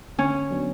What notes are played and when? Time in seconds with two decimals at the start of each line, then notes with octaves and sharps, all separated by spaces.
0.18 D3 C#4
0.51 F#3 B3 D4